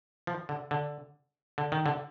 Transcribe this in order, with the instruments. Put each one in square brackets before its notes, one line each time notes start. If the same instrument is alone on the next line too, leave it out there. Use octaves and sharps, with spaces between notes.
[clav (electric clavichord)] F3
D3
D3
D3
D#3
D3